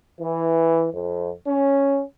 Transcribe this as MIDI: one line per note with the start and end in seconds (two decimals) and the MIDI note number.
0.20 0.88 52
0.93 1.31 41
1.47 2.01 61